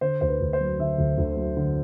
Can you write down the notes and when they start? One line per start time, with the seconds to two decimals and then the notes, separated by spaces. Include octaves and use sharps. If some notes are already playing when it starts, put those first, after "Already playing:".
0.01 D3 C5
0.21 D2 C5
0.28 B4
0.41 D2
0.53 C5
0.60 F#3
0.79 D3 E5
0.98 D2
1.18 D2
1.37 F#3
1.57 D3